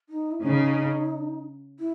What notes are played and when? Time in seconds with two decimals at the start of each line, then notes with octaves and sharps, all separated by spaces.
0.09 D#4
0.31 E4
0.43 C#3 D#4
1.79 E4